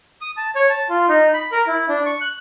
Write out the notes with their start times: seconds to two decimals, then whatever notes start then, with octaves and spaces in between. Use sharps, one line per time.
0.21 D#6
0.37 A5
0.56 C#5
0.70 A5
0.90 F4
1.09 D#4
1.34 B5
1.52 A#4
1.67 E4
1.89 D4
2.06 C#6
2.21 F#6